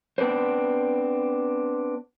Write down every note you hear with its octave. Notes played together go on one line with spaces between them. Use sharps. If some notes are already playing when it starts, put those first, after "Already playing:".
B3 C4 D4 B4 C5